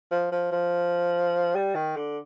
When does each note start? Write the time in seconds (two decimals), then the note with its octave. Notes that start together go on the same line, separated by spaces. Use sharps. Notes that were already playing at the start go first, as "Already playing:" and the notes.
0.11 F3
0.32 F3
0.52 F3
1.55 G3
1.75 D#3
1.96 D3